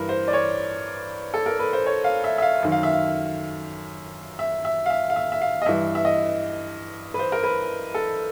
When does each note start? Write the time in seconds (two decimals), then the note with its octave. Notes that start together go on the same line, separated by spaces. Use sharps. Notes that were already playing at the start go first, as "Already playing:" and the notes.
Already playing: G2 E3 A#4 B4
0.09 C5
0.28 D5
0.33 C#5
1.34 A4
1.46 A#4
1.59 B4
1.73 C5
1.86 C#5
2.04 F5
2.24 E5
2.38 E5
2.42 F5
2.63 F#2 D#3
2.72 F5
2.83 E5
2.93 F5
4.39 E5
4.65 E5
4.86 F5
4.90 E5
5.10 F5
5.16 E5
5.32 E5
5.42 F5
5.62 D#5
5.66 G2 E3 E5
5.95 E5
6.05 D#5
7.14 B4
7.19 C5
7.32 A#4
7.44 B4
7.94 A4